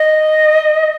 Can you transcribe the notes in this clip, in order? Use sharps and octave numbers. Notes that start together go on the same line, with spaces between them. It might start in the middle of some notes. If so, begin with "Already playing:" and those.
Already playing: D#5